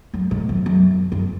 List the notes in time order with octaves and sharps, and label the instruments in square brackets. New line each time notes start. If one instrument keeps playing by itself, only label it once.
[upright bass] F#2
G#2
F#2
F#2
F#2